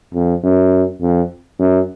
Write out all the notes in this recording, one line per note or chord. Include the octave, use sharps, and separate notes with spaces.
F2
F#2
F2
F#2